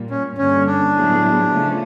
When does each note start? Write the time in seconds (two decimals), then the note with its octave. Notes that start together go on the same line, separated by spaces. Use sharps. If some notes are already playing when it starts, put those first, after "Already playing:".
Already playing: A#2 G3 A#3
0.10 C#4
0.38 G2 D3 G3 A#3 C#4
0.67 D4
0.94 A2 F#3 B3 E4 G#4
1.51 C#3 F3 A3 C#4